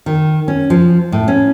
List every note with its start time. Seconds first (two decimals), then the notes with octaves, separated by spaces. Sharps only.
0.06 D#3
0.48 C#4
0.70 F3
1.12 A2
1.28 C#4